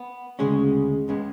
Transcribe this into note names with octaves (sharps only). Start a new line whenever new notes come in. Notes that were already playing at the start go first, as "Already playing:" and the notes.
Already playing: B3
D2 C#3 G#3 C#4 G#4
C#2 C#3 G#3 B3